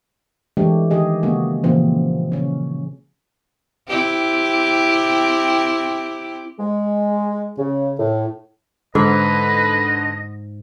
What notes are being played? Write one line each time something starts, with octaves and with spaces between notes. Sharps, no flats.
E3 G#3 A3 D4 G4 C#5
D#3 G4 G#4 D#5
C#3 G#3 A#3 B3 F#4 G#4
A#2 C#3 E3 F3 A#3 C4
C#3 C#4
C4 E4 G4
G#3
C#3
A2
G#2 D3 B4 D#5